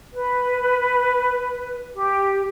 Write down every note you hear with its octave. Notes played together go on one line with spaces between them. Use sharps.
B4
G4